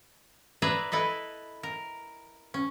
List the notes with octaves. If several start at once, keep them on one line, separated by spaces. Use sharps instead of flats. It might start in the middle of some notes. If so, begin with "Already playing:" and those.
G#4 B4 D5 E5 G#5 A#5
E4 A4 B4 D#5
A#4
C#4